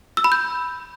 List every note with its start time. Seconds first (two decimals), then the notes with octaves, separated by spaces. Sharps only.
0.17 E6
0.24 B5
0.32 G6